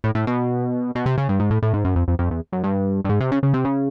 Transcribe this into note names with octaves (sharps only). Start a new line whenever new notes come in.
A2
A2
B2
B2
C3
C#3
G2
G#2
A2
A2
G#2
F#2
F2
F2
F2
E2
F#2
G2
G2
G#2
C3
C#3
C#3
C3
C#3